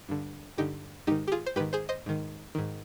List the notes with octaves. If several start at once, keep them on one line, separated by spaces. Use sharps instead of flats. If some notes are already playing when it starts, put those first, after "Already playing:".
G2 D3
G2 D3 D#4 G4
G#2 D#3 D#4 G4
G4
F4 G#4
C5
G#2 D#3 G4 B4
G#4 C5
C5 D#5
G#2 D#3
G#2 D#3